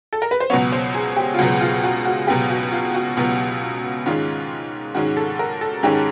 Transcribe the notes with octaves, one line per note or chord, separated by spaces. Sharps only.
A4
A#4
B4
C5
C#2 B2 F#3 B3 C#5
C5
G#4
G4
F4
C#2 B2 F#3 B3 F#4
F4
F#4
F#4
C#2 B2 F#3 B3 G4
F#4
F4
F#4
C#2 B2 F#3 B3
G#2 D#3 G#3 C#4 F4
G#2 D#3 G#3 C#4 F#4
A4
A#4
A4
G#2 D#3 G#3 C#4 G4